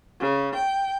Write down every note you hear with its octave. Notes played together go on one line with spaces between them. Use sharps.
C#3
G5